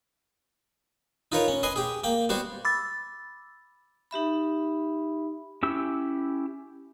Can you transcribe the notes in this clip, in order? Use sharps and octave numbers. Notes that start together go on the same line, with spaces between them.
D#4 F4 A#4 B4 C#5
C#4
B4 D#5 G#5 C6
G4 G#4
A#3 G5
G3 B3 F#4 C5
B5 D6 E6 A6
D#4 G4 E5 B5
C#4 E4 G4 E6